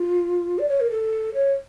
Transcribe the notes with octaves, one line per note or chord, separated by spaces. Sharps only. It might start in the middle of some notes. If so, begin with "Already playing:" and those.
Already playing: F4
D5
C#5
A#4
A4
C#5